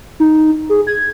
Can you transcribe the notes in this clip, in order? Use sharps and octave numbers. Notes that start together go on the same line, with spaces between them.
D#4
G#4
G#6